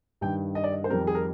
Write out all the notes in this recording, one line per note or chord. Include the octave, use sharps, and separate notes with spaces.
G2 D#3 G3 G5
D#5
D5
D#5
C5
F2 D#3 G3 C4 A#4
G#4
A#4